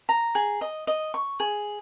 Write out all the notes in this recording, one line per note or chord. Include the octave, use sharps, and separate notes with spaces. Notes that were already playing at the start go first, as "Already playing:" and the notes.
A#5
G#4
D#5
D#5
C#6
G#4